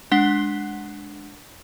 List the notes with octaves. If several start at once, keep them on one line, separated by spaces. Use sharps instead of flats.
G#3 D4 F#5 B6 G7